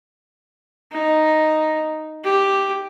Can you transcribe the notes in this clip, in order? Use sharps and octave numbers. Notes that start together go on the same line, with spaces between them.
D#4
G4